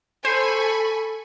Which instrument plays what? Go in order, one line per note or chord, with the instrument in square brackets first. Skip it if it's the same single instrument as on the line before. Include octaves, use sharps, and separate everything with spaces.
[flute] A4 [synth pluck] C5 [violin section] G#5 B5 C#6